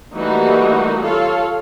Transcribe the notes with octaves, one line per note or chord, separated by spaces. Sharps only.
E3 G3 A3 A#3 D#4 F#4
F4 A4 C#5 F5